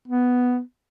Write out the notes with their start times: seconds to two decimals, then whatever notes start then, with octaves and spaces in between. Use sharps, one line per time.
0.08 B3